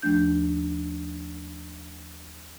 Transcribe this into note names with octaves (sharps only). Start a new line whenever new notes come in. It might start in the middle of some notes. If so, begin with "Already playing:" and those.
D#2 F3 A3 D4 G6